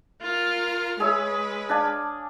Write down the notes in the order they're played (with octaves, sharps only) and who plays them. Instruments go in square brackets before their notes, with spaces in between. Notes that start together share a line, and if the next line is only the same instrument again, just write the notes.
[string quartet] F4 A#4 F6
[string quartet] G#3 B4 [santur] G#4 C#5 E5
[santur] D4 F5 G#5